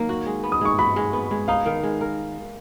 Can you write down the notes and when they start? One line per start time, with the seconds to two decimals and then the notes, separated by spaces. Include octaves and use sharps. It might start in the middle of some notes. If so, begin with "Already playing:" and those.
Already playing: D#3 F#3 A#3
0.09 F#4
0.26 G#3
0.43 B3
0.52 D#6
0.61 G#3 C#6
0.79 F#4 B5
0.96 G#3
1.13 B3
1.31 G#3
1.48 D#4 F5
1.66 D#3
1.83 G#3
2.01 A#4